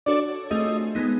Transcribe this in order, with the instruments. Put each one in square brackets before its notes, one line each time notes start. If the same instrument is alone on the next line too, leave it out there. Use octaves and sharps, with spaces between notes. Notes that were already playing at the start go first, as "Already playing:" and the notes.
[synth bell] D4 F#4 A4 C#5 [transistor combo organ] D5
[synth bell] A3 C4 F4 G#4 [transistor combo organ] D#5
[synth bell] G#3 B3 D#4